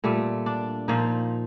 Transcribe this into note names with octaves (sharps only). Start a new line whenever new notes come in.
A#2 G3 A3
D4
A#2 F3 D#4